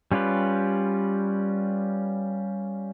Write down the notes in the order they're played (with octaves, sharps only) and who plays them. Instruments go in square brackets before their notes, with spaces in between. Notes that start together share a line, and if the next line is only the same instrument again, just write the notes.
[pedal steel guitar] G3 C#4 F4 G4 B4